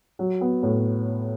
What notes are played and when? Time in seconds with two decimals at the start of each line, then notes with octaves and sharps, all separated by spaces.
0.19 F#3
0.41 B3
0.63 A2